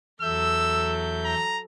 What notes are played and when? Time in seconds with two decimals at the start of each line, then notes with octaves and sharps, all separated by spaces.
0.22 E2 F#3 A4 E5 E6 G6
1.25 A#5